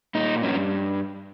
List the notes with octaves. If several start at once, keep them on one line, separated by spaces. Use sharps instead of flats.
A#2 D#4
G2 C#4